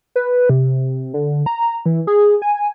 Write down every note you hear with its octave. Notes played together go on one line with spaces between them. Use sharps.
B4
C3
D3
A#5
E3
G#4
G#5